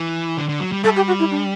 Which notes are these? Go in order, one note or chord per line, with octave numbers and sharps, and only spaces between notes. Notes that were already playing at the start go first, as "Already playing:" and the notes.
Already playing: E3
D3
D3
F#3
G3
G3 A4
G4
F#4
E4
D4